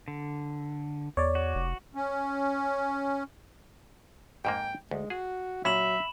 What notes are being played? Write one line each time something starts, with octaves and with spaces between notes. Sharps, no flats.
D3
E2 C#5 D5
F#4
F1
C#4
F2 G#2 A#3 G5
D2 G#3
F#4 G#4
A#2 F#3 C#4 E5 B5 E7 F#7